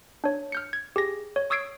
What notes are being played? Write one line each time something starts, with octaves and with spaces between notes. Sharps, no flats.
D4 C#5
F6 G6 C#7
G#6
G4 G#4 A#6
C#5
C#6 D#6 E6 G#6 C7 D7